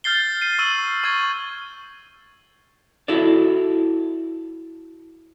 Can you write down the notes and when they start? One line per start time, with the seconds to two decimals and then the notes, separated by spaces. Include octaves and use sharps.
0.04 F6 G6 A6 C7 G7
0.41 C7 D#7
0.59 C#6 E6 D#7 F#7
1.04 C#6 G#6 D#7
3.08 E4 F#4 A4 D5